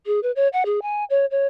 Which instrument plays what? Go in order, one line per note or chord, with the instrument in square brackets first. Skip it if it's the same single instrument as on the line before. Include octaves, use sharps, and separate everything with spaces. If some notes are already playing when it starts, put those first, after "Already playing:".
[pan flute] G#4
B4
C#5
F#5
G#4
G#5
C#5
C#5